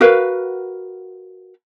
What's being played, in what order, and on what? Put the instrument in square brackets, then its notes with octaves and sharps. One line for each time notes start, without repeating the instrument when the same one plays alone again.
[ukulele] F#4 A#4 B4 F5